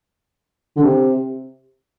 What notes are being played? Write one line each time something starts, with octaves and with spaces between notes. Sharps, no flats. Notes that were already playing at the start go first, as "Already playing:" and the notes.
D3
C3